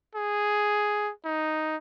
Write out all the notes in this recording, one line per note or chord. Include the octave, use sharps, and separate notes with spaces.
G#4
D#4